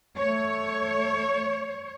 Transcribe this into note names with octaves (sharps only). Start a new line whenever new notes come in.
A3 C#5